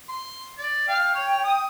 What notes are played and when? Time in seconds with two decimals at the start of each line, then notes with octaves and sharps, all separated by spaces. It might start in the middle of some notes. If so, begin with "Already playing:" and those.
0.09 C6
0.58 D5
0.88 F5 G5
1.14 C#5
1.44 D#6